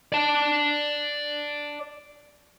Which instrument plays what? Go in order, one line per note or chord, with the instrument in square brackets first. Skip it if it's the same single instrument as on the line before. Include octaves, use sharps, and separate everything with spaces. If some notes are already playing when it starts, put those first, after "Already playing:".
[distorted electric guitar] D5 A5